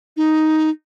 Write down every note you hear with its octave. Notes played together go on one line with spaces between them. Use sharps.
D#4